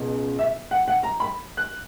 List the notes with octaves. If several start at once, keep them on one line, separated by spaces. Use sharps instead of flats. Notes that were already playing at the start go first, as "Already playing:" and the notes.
Already playing: C#2 B2
E5
F#5
F#5
A#5
B5
F#6